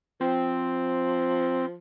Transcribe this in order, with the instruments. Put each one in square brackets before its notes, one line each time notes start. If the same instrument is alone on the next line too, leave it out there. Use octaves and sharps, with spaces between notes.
[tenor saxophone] F3 [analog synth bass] C4